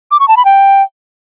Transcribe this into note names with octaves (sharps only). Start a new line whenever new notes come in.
D6
C#6
A5
B5
G5